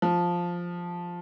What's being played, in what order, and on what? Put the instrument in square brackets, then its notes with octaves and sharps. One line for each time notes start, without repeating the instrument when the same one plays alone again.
[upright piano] F3